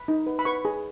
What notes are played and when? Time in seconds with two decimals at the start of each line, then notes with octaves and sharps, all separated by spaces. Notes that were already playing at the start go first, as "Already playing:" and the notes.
Already playing: B5
0.08 D#4
0.27 B4
0.39 B5
0.45 B4 C#6
0.65 G#4